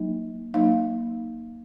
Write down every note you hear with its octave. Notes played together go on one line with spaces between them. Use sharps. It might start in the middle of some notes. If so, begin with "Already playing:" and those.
Already playing: F#3 A#3 D#4
F#3 A#3 D#4 F5